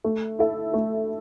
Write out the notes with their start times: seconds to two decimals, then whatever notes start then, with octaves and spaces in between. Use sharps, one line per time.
0.04 A3
0.39 E4 A4 E5
0.73 A3